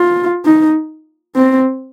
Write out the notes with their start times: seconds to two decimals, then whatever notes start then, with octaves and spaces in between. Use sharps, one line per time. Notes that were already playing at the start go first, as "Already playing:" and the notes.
Already playing: F4
0.46 D#4
1.36 C4